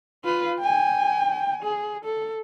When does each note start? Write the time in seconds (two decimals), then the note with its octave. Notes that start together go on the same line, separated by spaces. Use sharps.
0.25 F4 B4
0.60 G5 G#5
1.63 G#4
2.05 A4